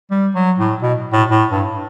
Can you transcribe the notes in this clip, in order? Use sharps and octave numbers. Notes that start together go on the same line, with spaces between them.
G3
F#3
A2
B2
A2
A2
G2